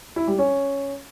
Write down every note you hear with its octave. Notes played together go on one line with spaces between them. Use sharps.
E4
G3
C#4